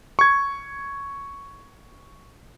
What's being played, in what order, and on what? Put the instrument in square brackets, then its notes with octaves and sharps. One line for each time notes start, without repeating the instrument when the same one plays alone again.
[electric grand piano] C#6 G#6